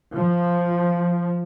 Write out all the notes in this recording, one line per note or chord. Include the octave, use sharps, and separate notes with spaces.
F3